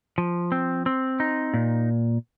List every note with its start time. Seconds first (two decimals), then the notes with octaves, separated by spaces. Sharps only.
0.18 F3
0.52 C4
0.86 C4
1.20 D#4
1.54 A#2